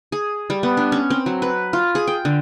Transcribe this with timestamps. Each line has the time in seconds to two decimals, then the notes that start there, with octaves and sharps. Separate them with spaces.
0.12 G#4
0.50 G3
0.63 B3
0.77 D4
0.92 C#4
1.10 C4
1.26 F#3
1.42 B4
1.73 F4
1.95 G#4
2.07 G5
2.25 D3